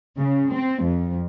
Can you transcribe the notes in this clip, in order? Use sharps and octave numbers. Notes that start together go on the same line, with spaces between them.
C#3
C4
F2